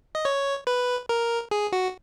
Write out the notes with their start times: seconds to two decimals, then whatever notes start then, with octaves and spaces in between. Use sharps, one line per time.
0.15 D#5
0.25 C#5
0.67 B4
1.09 A#4
1.51 G#4
1.72 F#4